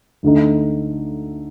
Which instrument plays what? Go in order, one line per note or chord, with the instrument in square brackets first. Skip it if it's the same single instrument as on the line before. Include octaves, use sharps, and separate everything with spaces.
[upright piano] D2 D3 A3 D#4